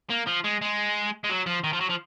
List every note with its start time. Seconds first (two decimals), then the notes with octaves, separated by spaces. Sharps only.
0.10 A#3
0.27 F3
0.44 G#3
0.62 G#3
1.24 G#3
1.30 F#3
1.46 F3
1.64 D#3
1.73 F3
1.80 F#3
1.89 F3